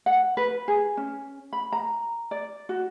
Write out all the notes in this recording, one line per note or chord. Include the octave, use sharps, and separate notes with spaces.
F#5
B4
G#4
C#4
B5
A#5
D5
F#4